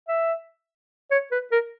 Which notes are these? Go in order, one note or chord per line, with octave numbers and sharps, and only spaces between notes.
E5
C#5
B4
A#4